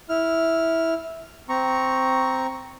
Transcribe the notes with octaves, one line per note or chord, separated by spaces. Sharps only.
E4 F6
C4 A#5 C#6